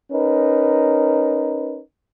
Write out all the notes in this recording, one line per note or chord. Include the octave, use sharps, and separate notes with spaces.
C#4 D#4 A#4 B4